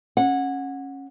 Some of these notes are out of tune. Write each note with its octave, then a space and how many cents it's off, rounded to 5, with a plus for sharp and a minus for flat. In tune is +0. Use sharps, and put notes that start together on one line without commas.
C#4 -15 F#5 -15